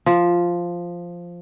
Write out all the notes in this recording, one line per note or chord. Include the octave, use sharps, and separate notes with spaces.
F3